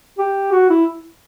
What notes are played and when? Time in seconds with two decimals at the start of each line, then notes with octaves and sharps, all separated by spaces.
0.18 G4
0.53 F#4
0.70 E4